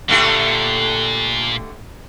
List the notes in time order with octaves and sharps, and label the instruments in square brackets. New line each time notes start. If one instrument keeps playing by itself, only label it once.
[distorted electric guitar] A#2 [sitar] D3 A3 G4